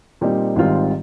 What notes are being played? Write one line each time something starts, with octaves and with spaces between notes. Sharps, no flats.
A#2 G3 C4 D#4
G#1 G#2 G3 C4 F4